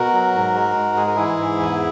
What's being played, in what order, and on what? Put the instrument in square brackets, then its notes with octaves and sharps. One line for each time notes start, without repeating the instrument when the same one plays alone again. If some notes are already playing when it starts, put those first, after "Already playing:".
Already playing: [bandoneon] B2 F#4 A#4
F#3
G#2
G#3
G#2
G#3 G#4
A#4
E3 E4 G#4
G#2
E2